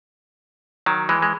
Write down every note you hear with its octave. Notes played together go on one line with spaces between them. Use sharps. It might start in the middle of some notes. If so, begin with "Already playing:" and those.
D#3 F#3
E3 G#3
G#3